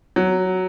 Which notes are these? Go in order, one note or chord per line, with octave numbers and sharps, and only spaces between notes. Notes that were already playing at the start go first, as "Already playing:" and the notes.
F#3